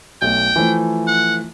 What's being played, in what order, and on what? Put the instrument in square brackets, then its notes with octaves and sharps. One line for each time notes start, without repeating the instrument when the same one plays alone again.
[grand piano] B1 A3 [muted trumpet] G5
[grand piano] E3 F3 A3
[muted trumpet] F#5